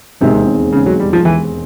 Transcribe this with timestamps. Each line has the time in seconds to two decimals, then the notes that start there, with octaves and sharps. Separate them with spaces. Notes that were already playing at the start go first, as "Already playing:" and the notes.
0.21 E1 D#2 C3 D#3 G#3 C4
0.73 C#3
0.86 F#3
1.00 G3
1.13 F3
1.25 E3